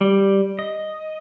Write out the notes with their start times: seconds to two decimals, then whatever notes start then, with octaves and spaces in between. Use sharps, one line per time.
0.01 G3
0.59 D#5